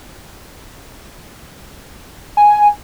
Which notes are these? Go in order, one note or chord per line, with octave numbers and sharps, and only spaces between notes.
G#5